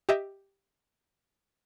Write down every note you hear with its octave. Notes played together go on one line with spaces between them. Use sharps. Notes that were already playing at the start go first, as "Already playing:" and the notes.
G4 D#5 E5